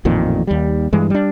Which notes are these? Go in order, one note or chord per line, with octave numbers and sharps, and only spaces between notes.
A1 F2 A#2 D#3
D#2 G3
G2 E3 G#3
G3 D4